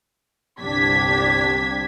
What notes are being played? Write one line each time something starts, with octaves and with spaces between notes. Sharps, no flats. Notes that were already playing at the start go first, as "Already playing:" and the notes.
G1 C2 D4 G4 G#6 B6